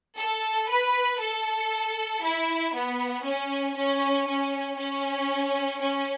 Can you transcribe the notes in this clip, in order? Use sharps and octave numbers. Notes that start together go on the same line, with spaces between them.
A4
B4
A4
E4
B3
C#4
C#4
C#4
C#4
C#4